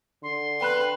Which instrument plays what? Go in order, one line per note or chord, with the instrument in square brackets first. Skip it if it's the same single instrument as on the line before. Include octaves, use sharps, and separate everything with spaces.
[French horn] D3 [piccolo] C6
[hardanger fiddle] B4 [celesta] G5 B5 F#6